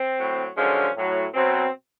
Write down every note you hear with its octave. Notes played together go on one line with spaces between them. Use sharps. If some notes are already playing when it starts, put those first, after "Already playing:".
Already playing: C4
A2 F#3
F#2 D3 F3 G#3 C#4
A2 F#3
B2 F#3 C4